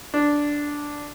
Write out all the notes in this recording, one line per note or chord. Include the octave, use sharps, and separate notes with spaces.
D4